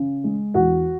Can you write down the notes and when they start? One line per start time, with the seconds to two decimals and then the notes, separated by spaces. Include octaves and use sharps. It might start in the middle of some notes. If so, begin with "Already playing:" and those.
Already playing: C#3
0.24 G#3
0.54 E2 F#4 F#5